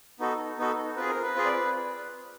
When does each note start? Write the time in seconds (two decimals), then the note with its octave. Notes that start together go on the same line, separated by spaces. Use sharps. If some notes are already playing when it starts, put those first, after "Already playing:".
0.19 B3 D#4 F#4 A4
0.58 B3 D#4 F#4 A4
0.97 C4 F4 G#4 B4
1.09 A#4
1.22 B4
1.35 C4 F4 G#4
1.45 D5